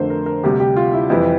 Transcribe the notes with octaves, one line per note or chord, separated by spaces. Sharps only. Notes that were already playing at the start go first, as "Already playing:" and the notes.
Already playing: F2 D3 A3 A#4 C5
A#4
A#4
D2 C3 G3 G4
G4
F4
E4
F2 E3 G3 E4